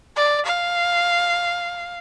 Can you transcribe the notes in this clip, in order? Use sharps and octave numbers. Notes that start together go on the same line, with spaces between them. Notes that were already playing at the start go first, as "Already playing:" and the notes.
D5
F5